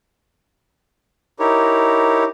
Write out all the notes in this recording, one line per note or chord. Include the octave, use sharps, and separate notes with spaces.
D#4 E4 G4 A#4 C#5